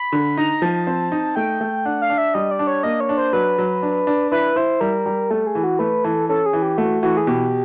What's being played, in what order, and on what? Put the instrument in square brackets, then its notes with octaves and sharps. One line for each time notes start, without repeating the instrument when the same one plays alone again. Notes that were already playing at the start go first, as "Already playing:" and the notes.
Already playing: [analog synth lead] B5
[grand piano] D3
[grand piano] D#4 [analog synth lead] A#5
[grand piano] F3 [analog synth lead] A5
[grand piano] C4
D#4
[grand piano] A3 [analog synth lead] G5
[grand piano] A3
[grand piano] D4 [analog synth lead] F#5
[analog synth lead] F5
[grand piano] D4
[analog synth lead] E5
[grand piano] G3 [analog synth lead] D#5
[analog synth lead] D5
[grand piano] D4
[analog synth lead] C#5
[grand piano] A#3 [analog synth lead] D#5
[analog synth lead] C#5
[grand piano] D4
[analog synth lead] C5
[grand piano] F#3 [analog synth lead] B4
[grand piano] F#3
D4
D4
[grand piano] E4 [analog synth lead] B4
[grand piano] E4 [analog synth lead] C5
[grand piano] G3 [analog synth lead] A#4
[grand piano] G3
[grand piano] A3 [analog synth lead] A4
[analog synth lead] G#4
[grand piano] E3
[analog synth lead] F#4
[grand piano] A3 [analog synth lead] B4
[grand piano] E3 [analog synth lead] A4
[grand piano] C#4 [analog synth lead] A4
[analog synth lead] G#4
[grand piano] E3
[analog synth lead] G4
[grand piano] A3 [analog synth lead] F#4
[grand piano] E3 [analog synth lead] F#4
[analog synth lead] G#4
[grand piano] B2 [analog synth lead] G4